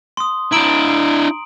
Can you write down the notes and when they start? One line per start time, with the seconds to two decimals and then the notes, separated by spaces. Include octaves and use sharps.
0.17 C6 D#6
0.53 D4 E4 A#5 D7 F#7